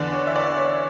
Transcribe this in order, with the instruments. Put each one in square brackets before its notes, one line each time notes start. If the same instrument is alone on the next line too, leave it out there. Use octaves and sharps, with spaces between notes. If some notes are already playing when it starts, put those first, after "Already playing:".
Already playing: [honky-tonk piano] E2 D3 D5
C#5
E5
D5
C#5